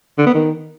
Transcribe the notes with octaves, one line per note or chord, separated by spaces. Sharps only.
D3
B3
D#3